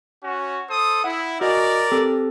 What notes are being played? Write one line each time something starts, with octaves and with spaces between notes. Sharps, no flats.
C#4 F#4
A4 C5 D#6
E4 F#5
F#4 A#4 D5 D#5 G#5
C4 G4 A4